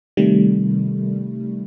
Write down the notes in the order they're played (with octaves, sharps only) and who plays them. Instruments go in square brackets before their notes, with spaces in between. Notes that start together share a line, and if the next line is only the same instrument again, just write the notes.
[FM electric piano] C3 D#3 G3 A3